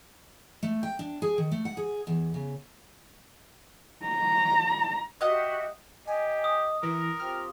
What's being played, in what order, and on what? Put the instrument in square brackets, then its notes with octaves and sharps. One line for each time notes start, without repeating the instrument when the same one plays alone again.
[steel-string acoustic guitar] A3
G5
D4
G#4
D#3
A3
F#5
G#4
E2
C#3
[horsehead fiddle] A#5
[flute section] F#4 G4 E5 [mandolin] D#5 F#5
[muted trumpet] G4 [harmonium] D#5 [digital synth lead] G#5
[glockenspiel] D#6
[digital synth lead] E3 [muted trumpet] A#4
[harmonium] C4 F4 G4 [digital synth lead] F6